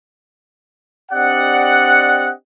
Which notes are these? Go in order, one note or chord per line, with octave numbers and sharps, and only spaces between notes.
C4 D4 G4 D5 D#5 F#5